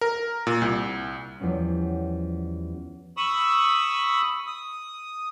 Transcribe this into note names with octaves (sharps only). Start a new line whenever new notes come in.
A#4
A#2
C2
E2 F3 G3 B3 C#4
B5 C#6 D#6 E6
D#6